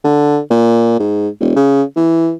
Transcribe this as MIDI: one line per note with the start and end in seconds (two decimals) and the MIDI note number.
0.04 0.39 50
0.50 0.94 46
0.99 1.28 44
1.40 1.56 28
1.56 1.83 49
1.96 2.33 52